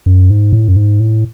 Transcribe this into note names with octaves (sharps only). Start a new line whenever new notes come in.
F#2
G#2
A2
F#2
G#2
A2